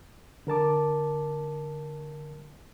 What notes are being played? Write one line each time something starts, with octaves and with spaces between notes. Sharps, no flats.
D3 A#4 A5 D6